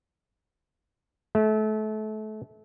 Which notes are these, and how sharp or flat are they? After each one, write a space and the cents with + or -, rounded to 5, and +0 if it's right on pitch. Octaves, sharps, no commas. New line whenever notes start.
A3 -30